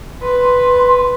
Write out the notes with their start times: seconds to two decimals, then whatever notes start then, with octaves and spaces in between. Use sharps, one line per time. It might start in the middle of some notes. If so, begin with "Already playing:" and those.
0.22 B4 C6